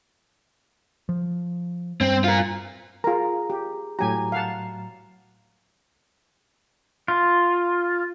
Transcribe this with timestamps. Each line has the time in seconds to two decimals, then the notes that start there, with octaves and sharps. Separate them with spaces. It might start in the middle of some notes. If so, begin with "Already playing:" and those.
1.09 F3
2.01 G2 C4
2.24 F4 A#4
3.04 F4 G#4 A#4 A#5
3.50 G4
3.99 A2 F#3 G4 G#5 A#5
4.32 F5 F#5 A5
7.08 F4